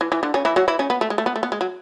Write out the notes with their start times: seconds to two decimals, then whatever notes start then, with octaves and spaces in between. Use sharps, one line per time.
0.01 E3
0.12 E3
0.23 D3
0.34 C#3 C#4
0.45 E3 E4
0.56 F#3 F#4
0.68 E3 E4
0.79 C#3 C#4
0.90 B3
1.01 A3
1.10 G#3
1.18 A3
1.26 B3
1.36 A3
1.43 B3
1.52 G#3
1.61 F#3